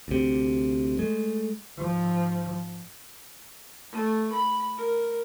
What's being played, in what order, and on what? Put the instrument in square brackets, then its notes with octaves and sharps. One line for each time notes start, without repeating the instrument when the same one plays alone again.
[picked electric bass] D2 C3
G#3 A3
[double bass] G#2 F3
[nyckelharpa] A3
B5
A#4